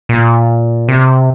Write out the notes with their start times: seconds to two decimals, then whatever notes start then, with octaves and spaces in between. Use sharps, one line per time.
0.09 A#2
0.88 C3